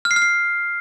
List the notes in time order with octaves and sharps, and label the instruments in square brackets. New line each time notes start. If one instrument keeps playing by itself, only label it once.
[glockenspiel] F6
C7
F6
C7